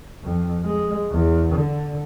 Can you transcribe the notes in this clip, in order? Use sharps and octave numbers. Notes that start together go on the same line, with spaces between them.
F2
G#3
E2
D3